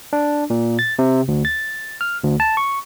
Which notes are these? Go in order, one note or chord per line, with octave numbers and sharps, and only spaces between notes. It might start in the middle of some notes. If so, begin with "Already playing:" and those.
D4
A#2
A6
C3
D2
A6
F6
D2
A5
C#6